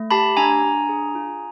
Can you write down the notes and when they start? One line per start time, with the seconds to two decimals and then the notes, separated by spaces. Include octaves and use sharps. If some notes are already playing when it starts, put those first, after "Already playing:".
Already playing: A3
0.11 G4 A5 B5
0.37 D4 G#5 A#5
0.63 D4
0.89 G#4
1.15 F4